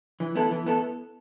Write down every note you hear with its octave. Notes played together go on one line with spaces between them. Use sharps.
E3
B3 E4 A4
E3
B3 E4 A4